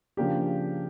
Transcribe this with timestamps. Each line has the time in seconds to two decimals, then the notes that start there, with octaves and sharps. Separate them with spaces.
0.17 C#3 F3 A#3 D4 G4